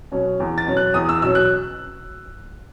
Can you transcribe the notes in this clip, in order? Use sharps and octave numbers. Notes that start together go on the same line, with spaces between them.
B2 F#3 C#4
E2
A6
B2 F#3 C#4
F#6
E2 D#6
E6
B2 F#3 C#4 E6
F#6